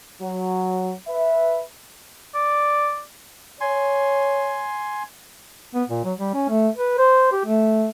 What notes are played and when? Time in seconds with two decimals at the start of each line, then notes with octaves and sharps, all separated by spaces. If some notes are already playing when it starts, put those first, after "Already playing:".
0.21 F#3
1.08 B4 E5
2.34 D5
3.61 C#5 G#5 C6
5.74 B3
5.89 A#2
6.05 F#3
6.18 G3
6.34 C#4
6.49 A3
6.77 B4
6.98 C5
7.32 G4
7.45 A3